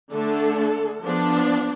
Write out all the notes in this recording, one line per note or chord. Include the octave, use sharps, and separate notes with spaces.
D3 A3 D4 A4
F3 B3 D4